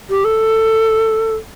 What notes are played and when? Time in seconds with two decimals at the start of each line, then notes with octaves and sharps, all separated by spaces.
0.09 G4
0.24 A4